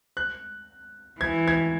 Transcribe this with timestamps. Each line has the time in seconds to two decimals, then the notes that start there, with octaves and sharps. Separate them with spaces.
0.17 F#6
1.20 E3 G#6
1.48 G#6